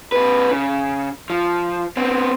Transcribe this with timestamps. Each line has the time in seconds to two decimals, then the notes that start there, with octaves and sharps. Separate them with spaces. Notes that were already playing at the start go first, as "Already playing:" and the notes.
0.12 C3 B4
0.51 C#3
1.30 F3
1.97 B3 C4